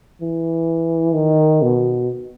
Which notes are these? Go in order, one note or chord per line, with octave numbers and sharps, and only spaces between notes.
E3
D#3
B2